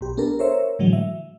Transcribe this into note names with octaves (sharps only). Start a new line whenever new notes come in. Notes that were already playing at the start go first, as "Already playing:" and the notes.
B1 G4
B3 D4 A4 A#4
A#4 C5 C#5 E5
A2 D3 E3 F#3 G#3
E5